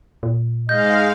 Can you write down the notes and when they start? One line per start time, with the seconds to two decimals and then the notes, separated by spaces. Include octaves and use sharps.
0.23 A#2
0.69 G#2 G#3 D#5 F5 G6